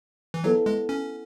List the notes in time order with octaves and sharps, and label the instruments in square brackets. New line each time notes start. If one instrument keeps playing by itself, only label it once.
[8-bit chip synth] E3
[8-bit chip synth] F#3 [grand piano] B3 E4 A4
[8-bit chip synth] G#3
C#4